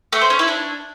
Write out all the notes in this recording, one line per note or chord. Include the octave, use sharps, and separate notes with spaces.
A3
C5
C#4
E4
D4